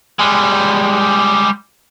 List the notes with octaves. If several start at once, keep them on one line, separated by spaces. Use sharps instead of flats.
G3 G#3